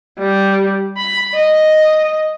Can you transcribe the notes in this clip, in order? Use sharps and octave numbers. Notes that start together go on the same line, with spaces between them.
G3
B5
D#5